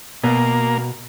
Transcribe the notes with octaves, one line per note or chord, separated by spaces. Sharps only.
B2 A#3